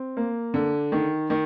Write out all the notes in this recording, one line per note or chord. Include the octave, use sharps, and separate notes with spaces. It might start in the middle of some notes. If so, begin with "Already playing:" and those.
Already playing: C4
A#3
D3
D#3
D#3